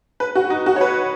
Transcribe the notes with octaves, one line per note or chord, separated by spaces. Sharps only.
B4
F#4
D#4
F#4
C#5
B4